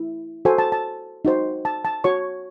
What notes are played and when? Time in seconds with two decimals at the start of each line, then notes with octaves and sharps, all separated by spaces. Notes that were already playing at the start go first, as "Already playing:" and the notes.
Already playing: E4
0.45 F#4 A4 C5 G#5
0.58 A5
0.72 A5
1.25 D#4 F#4 C5
1.65 A5
1.85 A5
2.04 F#4 C#5 C#6